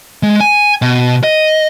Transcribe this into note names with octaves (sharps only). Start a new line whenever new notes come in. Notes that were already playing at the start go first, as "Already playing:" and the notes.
G#3
G#5
B2
D#5